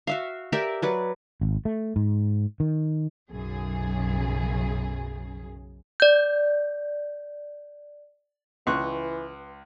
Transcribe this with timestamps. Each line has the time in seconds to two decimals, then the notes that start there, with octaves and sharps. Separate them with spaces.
0.07 F#4 E5 F5
0.52 G4 A#4 D5 E5
0.82 F#3 B4 D5
1.41 G#1
1.65 A3
1.96 G#2
2.60 D#3
3.31 B1 F#2 C#3 G#4
6.00 D5 G6
8.67 C#2 E3 B4 C6 C#6 F#6